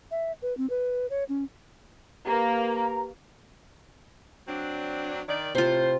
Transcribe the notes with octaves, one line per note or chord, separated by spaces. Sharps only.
E5
B4
C4
B4
C#5
C#4
A#3 G4 B4 A#5
F#3 C4 D4
D#3 D5
A2 C3 F4 C5